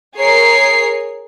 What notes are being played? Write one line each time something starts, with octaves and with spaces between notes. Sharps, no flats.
G#4 A#4 C#5 C7